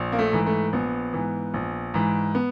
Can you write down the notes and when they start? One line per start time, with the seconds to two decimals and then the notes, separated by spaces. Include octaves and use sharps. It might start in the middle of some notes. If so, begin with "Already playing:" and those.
Already playing: A#1
0.12 A#3
0.19 A3
0.33 G#2 E3
0.46 A3
0.73 A#1 B3
1.14 G#2 E3
1.54 A#1
1.94 G#2 E3
2.35 B3